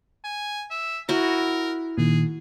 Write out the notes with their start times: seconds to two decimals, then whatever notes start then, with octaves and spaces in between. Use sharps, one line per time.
0.24 G#5
0.71 E5
1.09 E4 F#4 A#4
1.98 A#2 D#3 G#4